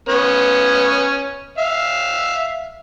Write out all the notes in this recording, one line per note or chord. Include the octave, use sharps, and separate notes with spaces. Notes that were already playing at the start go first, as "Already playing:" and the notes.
B3 C#4
E5 F5